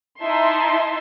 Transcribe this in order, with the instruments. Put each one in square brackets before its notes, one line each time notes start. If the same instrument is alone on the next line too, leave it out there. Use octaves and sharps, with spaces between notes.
[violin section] D#4 E4 E5 A5 C6